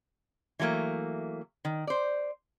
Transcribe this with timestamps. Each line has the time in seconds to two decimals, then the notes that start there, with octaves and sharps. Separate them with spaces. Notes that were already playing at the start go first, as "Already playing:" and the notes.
0.59 E3 F#3 A3 A#3
1.65 D#3
1.87 C5 D5